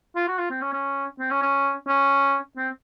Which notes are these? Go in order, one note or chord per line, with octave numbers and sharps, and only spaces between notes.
F4
F#4
F4
C4
C#4
C#4
C4
C#4
C#4
C#4
C4